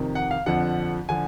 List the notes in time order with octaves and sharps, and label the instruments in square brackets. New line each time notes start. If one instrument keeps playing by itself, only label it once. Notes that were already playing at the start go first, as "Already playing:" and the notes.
Already playing: [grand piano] F2 C3 D#3
F#5
F5
F2 D3 F3 F#5
D3 F3 G#5